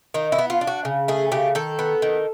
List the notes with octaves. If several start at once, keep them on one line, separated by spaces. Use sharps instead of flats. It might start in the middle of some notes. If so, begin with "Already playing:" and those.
D#3 D#4
E4
B3
F4
D4
F#4
C#3
A3 G#4
C#3 G4
D#3 A4
B3
D#3